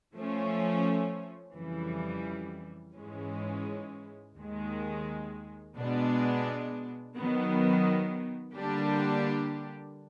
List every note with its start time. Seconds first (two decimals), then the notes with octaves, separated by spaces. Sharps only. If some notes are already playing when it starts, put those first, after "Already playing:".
0.15 F3 A3 C#4
1.55 F2 C#3 E3 G3
2.95 G#2 E3 G#3 C#4
4.36 D#2 D#3 G#3
5.75 B2 G#3 B3 D4
7.15 D#3 F#3 B3
8.55 D3 G3 A#3 D4 G4